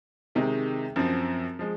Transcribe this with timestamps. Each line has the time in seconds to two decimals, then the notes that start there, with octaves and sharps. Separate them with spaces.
0.35 C3 D#3 G#3 D#4
0.96 F#2 F3 C4
1.59 F3 G#3